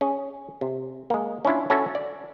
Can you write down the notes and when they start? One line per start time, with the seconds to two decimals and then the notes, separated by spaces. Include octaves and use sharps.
0.01 C#4 G#4
0.61 C3
1.10 G#3 A#3
1.45 C#4 D4 E4 F4
1.70 C#4 E4 F#4 A4 E5 A5
1.95 D5